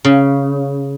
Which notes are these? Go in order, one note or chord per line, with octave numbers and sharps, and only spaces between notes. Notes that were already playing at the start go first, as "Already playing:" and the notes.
C#3